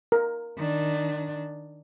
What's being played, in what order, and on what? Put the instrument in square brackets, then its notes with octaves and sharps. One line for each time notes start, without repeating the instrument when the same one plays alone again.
[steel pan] A#4
[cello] D#3 D4